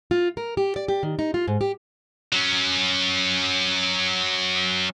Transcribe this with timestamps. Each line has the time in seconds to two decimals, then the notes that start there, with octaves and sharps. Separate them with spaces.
0.11 F4
0.37 A#4
0.57 G4
0.76 D5
0.88 G4
1.03 D#3
1.19 D#4
1.34 F4
1.47 G#2
1.61 G4
2.32 F#3 C#4